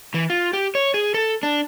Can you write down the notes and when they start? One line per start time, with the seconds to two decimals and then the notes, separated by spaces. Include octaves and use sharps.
0.14 E3
0.30 F4
0.53 G4
0.75 C#5
0.94 G#4
1.14 A4
1.43 D4